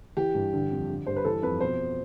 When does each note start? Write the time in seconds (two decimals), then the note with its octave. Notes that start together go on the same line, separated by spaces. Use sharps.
0.17 E3 G4
0.35 G2
0.53 D3
0.71 F2
0.89 D3
1.07 G2 C5
1.16 B4
1.25 E3 A4
1.42 F2 B4
1.60 B2 C5